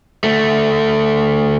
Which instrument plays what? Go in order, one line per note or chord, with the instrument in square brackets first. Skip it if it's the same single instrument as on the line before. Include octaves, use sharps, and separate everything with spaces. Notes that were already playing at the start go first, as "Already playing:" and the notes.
[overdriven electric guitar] D2 A3